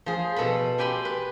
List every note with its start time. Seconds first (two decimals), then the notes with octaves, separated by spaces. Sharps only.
0.06 F3 G#4
0.36 B2 A4 B4 B5
0.78 G4 G5 G#5 B5 C6
1.05 B4